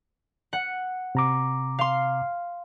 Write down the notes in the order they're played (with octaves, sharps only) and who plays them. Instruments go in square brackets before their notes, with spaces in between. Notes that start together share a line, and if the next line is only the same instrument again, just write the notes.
[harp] F#5
[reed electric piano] C3 A#5 D6
[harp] F5 C6